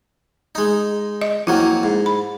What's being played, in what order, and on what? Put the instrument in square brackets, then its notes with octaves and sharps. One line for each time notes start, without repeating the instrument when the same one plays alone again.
[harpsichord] G#3 D#4
[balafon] D#5
[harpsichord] F2 F#3 A#3 [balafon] E4
[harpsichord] G#2
[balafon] B5